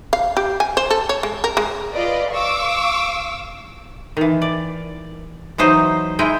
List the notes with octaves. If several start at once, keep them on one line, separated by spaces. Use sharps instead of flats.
F5
G4
G#5
C5
A4
C#5
G#3
A#4
G#3
F4 B4 D5 D#5
F5 C#6 D6 E6
D#3 E3
D5
E3 F#3 D#4 C5 D#5
G#3 D#4 E4 D#5 G5